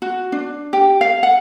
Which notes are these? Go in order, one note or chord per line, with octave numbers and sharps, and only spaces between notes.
F#4
D4
G4
F5
F#5